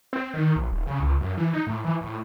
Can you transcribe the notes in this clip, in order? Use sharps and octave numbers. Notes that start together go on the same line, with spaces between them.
C4
D#3
A#1
D#1
C#3
C#2
F#2
E3
D#4
A2
E3
A2